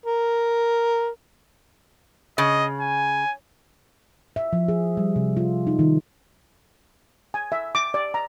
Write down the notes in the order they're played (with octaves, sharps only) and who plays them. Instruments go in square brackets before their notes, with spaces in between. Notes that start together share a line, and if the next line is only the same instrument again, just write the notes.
[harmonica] A#4
[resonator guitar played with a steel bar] C#3 [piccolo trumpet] D#5
[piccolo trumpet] G#5
[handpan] E5
F3
G#4
G3
C3
F4
D#4
D#3
[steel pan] G#5
E5
D6
D5
A#5